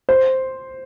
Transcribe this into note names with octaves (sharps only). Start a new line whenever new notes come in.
C5